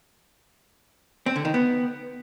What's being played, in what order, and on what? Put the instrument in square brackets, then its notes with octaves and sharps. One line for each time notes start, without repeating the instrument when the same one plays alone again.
[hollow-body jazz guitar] C4
D3
D#3
B3